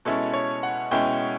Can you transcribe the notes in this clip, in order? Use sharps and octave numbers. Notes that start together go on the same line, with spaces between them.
B2 G#3 C#4 E4 A4
C#5
F#5
B2 G#3 C#4 E4 G5